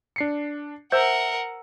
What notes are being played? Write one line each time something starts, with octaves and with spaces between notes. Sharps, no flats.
D4 C7 C#7
A#4 C5 E5 F#5 E6